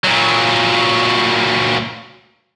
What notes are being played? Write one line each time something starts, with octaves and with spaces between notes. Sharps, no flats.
A#2 F#3